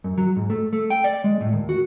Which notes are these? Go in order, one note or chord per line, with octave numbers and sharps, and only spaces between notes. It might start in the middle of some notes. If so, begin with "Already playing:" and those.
F#2
F#3
G#2
A3
A3
G5
D5
G#3
A2
D#2
F#4